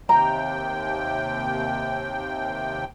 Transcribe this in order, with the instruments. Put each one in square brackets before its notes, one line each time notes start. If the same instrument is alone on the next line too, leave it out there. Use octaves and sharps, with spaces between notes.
[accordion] D#2 C3 G5 [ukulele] A#5